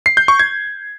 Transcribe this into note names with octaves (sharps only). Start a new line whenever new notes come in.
C7
G6
C#6
G#6